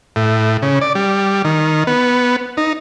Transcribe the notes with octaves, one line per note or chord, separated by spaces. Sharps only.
A2
C#3
D5
G3
D#3
B3
D#4